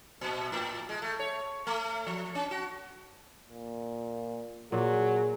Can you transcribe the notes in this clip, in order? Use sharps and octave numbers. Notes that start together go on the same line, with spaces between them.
A#2
A2
G#3
A3
C#5
A3
F3
C#4
F#4
A#2
A#2 F#3 G#4